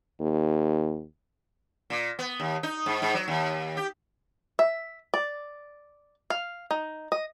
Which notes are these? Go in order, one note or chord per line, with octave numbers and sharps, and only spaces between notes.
D#2
A#2
B3
D#2
D#4
G#2
G#2
F#3
D#2
G4
E5
D5
F5
D#4
D#5